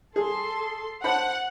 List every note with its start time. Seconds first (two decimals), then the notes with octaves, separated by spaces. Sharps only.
0.16 G#4 A4 C6
1.04 C5 F#5 A5 B5